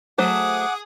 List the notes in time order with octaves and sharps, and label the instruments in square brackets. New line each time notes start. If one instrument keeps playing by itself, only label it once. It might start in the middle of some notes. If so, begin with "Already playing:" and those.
[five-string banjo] F#3 A3 C5 [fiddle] G#4 D#6 [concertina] F#5 D6